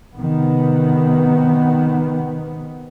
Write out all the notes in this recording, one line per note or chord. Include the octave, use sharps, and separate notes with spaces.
C3 D#3 B3